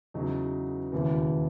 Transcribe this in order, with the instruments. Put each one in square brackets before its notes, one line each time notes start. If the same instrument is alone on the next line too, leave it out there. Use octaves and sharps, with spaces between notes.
[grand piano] E2 C#3 F#3 D#4
E1 D#2 C#3 E3